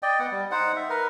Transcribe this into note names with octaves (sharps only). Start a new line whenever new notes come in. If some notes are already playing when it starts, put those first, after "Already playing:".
D5 D#5 G5
B3 F#5
G3
D#4 C5 F#5
E5
A#4 B4